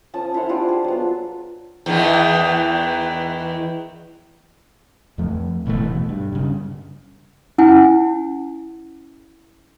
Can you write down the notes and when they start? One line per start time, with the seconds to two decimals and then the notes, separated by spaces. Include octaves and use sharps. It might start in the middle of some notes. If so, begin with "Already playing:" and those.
0.13 F3 C#4 A5 D#6
0.34 E4 C5 C#5 F#5
0.49 D4 F4 G4 D6
0.69 G#4
0.84 F#3 B3
1.86 E2 D#3 E3
5.18 F2 F3 A3
5.66 D1 B2 E3 A3
5.87 B2
6.09 G2
6.32 G2 C#3
7.58 C#4 E4 F#5 G#5